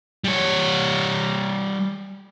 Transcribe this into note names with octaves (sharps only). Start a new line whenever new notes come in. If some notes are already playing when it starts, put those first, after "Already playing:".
G3 C#5